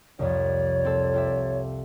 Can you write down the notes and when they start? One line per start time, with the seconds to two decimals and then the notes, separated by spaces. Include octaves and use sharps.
0.19 C2 F2 C#5 D5
0.85 C4 A4
1.13 F4 G4 E5